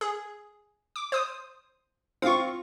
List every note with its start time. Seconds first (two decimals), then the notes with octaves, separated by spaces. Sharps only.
0.01 G#4
0.96 D6
1.12 C5 D#6
2.22 C4 F4 F5 C#6